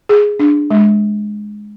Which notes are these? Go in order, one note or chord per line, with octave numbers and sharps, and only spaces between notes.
G#4
D4
G#3